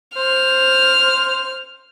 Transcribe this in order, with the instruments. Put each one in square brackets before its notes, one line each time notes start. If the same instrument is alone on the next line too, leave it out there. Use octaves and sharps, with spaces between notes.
[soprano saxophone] C5 [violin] F6